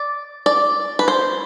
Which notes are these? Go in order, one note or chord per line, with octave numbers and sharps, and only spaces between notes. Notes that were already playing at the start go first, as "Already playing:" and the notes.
Already playing: D5
D5
B4
C5